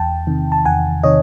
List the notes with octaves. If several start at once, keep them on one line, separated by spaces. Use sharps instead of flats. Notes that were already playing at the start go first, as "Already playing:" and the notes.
Already playing: E2 G5 A5
C3 D#3
A5
E2 F#5 G#5
C3 D#3 C#5 D#5